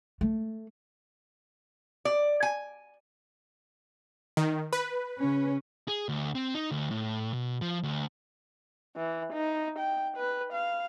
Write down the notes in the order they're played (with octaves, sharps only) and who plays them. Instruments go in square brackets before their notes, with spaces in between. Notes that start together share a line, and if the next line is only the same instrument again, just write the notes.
[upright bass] A3
[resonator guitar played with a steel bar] D5
G#5
[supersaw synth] D#3
B4
[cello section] C#3 C#4
[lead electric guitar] G#4
D2
C4
D#4
D2
A2
B2
F3
D2
[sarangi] E3
D#4
G5
B4
F5